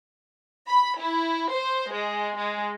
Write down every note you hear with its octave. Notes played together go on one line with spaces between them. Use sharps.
B5
E4
C5
G#3
G#3